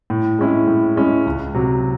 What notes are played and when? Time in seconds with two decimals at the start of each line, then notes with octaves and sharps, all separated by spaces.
0.10 A2
0.39 G#3 C#4 E4
0.67 A2
0.96 G#3 C#4 E4
1.26 C#2
1.54 C3 F#3